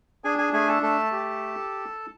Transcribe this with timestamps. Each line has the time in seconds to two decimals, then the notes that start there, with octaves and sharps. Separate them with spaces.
0.24 D4 G#4 G#5
0.38 G#4 G#5
0.53 A3 G#4 G#5
0.68 A4 A5
0.83 A3 A4 A5
1.12 G4